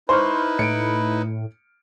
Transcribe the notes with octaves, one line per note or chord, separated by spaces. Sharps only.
D#4 E4 B4 C5 C#6 F6
A2 C#7 D7